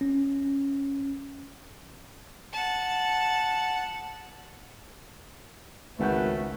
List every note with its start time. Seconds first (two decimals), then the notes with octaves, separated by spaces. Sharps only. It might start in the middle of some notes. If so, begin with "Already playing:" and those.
0.01 C#4
2.53 F#5 A5
5.99 G#1 C#2 A3 C#4 B4 F#5 G6